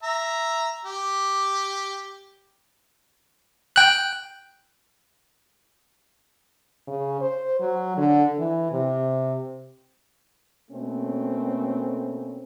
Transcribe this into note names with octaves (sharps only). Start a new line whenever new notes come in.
E5 A#5
G4
G5 F#6
C#3
C5
F#3
D3
E3
C3
B2 A3 A#3 C4 C#4